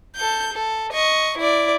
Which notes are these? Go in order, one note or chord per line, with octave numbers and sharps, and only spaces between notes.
A4 G6
A4
D#5 C#6
E4 D5